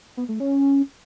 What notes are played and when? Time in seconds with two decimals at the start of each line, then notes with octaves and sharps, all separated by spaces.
0.17 B3
0.29 A3
0.40 C#4